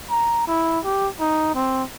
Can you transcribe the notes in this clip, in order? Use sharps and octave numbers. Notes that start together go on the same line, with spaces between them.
A#5
E4
G4
D#4
C4